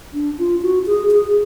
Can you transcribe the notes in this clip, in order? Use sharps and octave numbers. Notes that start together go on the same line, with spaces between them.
D4
F4
F#4
G#4
G#4